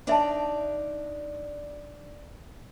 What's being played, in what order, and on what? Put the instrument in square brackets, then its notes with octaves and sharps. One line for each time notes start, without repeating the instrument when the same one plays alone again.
[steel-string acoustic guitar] D4 D#4 D5 [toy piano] C#5 E5 A5